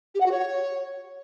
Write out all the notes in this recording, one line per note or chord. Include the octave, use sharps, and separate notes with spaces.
G4
F#5
F#4
C#5